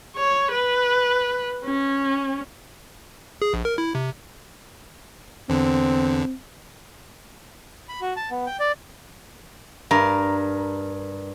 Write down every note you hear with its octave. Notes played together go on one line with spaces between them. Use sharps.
C#5
B4
C#4
G#4
A#1
A#4
E4
C3
E2 D3 C4
B5
F#4
A5
B3
G5
D5
G2 A#4